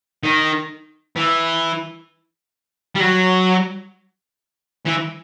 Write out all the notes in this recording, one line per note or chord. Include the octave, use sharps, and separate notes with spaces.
D#3
E3
G3
F#3
E3